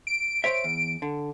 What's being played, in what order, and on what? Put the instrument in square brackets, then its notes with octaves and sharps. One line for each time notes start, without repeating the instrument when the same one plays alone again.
[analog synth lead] D7
[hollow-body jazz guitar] C5 C#5 E5
E2
D3